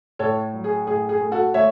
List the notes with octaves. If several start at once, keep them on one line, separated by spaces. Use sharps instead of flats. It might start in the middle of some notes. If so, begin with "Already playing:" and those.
A2 A4 C#5
F#3
G#4
A2 G#4
G#4
A3
F#4 A4
A3 C#5 E5